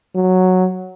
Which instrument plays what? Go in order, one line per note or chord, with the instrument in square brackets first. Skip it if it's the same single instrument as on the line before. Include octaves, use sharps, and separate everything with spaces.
[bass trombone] F#3